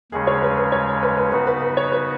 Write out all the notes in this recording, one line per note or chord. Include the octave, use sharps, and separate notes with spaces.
D#2 C#3 G#3 C#4 G#4
C#5
B4
B4
C#5
B4
B4
C#3 B3 D#4 F#4 B4
B4
B4
C#5
B4